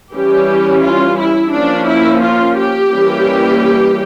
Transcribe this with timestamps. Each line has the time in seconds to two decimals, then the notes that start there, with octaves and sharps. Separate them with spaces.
0.14 E3 G3 C#4 G4
0.84 F4
1.18 E4
1.52 F3 A#3 C#4 D4
1.88 E4
2.22 F4
2.57 G4
2.91 E3 G3 A#3 C#4